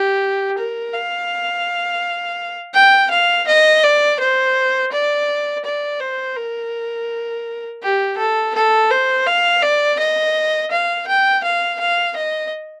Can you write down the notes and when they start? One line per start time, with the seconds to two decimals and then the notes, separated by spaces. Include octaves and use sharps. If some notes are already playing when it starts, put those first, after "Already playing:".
Already playing: G4
0.57 A#4
0.93 F5
2.74 G5
3.10 F5
3.47 D#5
3.83 D5
4.19 C5
4.92 D5
5.64 D5
6.00 C5
6.36 A#4
7.82 G4
8.17 A4
8.55 A4
8.90 C5
9.26 F5
9.62 D5
9.99 D#5
10.71 F5
11.07 G5
11.43 F5
11.80 F5
12.16 D#5